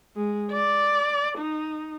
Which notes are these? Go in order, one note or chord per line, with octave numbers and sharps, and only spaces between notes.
G#3
D5
D#4